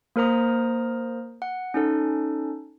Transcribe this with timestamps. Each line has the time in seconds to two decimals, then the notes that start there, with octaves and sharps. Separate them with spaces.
0.16 A#3 A#4 C5 A#5 D#6
1.42 F#5
1.74 C#4 D#4 A4